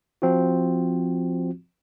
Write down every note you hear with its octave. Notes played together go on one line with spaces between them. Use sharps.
F3 C4 F4 F#4